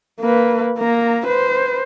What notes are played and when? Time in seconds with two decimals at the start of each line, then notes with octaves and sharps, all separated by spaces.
0.21 A#3 B4
0.79 A#3 A#5
1.27 B4 C5